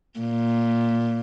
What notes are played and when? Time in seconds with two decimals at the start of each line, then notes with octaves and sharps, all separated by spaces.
0.20 A#2